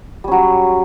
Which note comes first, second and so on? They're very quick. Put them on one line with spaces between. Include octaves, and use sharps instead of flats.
G3 C#4 F#3